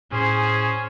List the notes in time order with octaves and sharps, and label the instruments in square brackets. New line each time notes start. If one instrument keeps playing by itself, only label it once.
[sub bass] A2 [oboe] C#4 [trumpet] G#4 [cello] C5